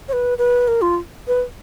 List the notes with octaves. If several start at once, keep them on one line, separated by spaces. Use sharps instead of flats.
C#5
B4
B4
A#4
F4
B4